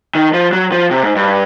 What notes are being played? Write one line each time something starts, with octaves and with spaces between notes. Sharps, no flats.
D#3
F3
F#3
F3
C3
G#2
G2